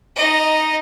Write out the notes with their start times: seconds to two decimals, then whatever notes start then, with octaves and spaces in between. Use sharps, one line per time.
0.16 D#4 D#5